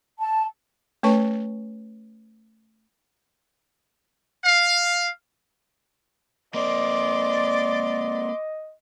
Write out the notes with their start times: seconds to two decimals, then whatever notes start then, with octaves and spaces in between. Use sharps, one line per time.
0.18 A5
1.03 A3 C#4 B4 C#5 A5 C#6
4.45 F5
6.54 A#3 C4 D5 D#5 C6 D6